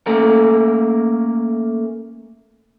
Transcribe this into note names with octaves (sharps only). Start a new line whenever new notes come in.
A3 A#3 C#4 A#4